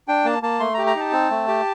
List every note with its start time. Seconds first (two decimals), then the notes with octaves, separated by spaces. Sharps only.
0.08 D4 G5
0.25 A#3 A5
0.42 A#3 A5
0.60 A3 C6
0.74 A#5
0.78 G4
0.87 A#5
0.95 D#4 A5
1.12 C4
1.30 A3
1.48 G4